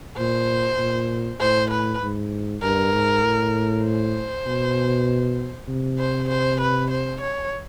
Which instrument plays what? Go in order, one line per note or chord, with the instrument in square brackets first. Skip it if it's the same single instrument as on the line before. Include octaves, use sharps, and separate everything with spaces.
[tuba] A#2 [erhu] C5
[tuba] A#2
[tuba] A2 [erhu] C5
[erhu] B4
[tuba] G#2
[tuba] G2 [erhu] A#4
[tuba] G#2
A2
[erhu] C5
[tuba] B2
C3
[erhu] C5
C5
B4
C5
C#5